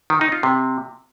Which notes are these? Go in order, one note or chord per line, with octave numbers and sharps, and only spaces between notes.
D#3
D#4
F4
C3